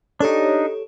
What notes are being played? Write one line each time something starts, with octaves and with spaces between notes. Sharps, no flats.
D4 D#4 G4 A4 C#5